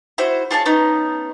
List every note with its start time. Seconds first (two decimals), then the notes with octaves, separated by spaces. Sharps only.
0.18 E4 F#4 C5
0.51 F4 G#4 C#5 A5
0.66 B3 C#4 D#4